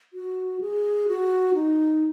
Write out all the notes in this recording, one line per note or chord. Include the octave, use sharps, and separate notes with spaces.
F#4
G#4
F#4
D#4